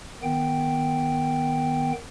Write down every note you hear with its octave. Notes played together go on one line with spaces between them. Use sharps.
D#3 B3 G5